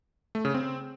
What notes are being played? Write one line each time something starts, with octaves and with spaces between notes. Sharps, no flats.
A3
C#3
C4